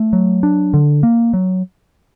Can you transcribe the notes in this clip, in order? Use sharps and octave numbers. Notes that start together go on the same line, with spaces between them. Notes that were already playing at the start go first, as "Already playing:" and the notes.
Already playing: A3
F#3
D4
D3
A#3
F#3